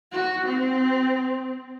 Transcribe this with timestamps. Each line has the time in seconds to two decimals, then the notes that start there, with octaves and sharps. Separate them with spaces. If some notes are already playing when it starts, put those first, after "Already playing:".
0.12 F#4
0.45 C4